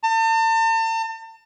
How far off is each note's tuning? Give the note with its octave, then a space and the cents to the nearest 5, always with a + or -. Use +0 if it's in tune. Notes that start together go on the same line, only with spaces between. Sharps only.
A5 +40